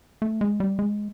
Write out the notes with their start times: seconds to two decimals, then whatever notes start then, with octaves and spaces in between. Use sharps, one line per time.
0.22 A3
0.41 G#3
0.60 G3
0.79 G#3